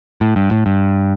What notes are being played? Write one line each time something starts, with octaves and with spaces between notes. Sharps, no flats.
A2
G2
A2
G2